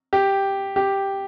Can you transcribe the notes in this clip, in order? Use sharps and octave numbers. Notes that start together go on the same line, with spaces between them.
G4
G4